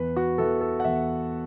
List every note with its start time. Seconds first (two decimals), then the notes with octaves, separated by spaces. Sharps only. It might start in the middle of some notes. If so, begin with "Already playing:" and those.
Already playing: E2 B4
0.16 F#4
0.38 E3 B3 A4
0.61 A4
0.80 F#5
0.84 E2 E5